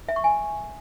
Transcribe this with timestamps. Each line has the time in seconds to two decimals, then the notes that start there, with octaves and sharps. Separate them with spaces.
0.09 E5
0.16 C#6
0.24 G#5